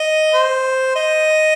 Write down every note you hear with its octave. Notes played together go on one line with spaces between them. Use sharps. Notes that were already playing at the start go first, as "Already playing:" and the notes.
Already playing: D#5
C5
D#5